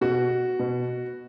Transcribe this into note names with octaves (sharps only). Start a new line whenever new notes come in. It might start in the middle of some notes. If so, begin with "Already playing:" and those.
B2 F#4
B2